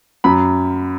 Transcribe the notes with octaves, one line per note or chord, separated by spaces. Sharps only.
F#2 B5